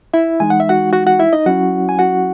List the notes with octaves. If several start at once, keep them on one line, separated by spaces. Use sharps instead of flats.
E4 E5
E3 G#3 D#4 G#5
F#5
E5
F#4 F#5
F#4 F#5
F#4 F#5
E4 E5
D#4 D#5
F#3 C#4 E4 F#4 F#5
G#5
F#4 F#5